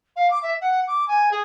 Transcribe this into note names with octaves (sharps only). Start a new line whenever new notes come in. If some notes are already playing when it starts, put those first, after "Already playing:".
F5
D6
E5
F#5
D6
G#5
G#4